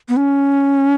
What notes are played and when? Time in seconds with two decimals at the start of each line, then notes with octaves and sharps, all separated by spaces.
0.09 B3
0.17 C#4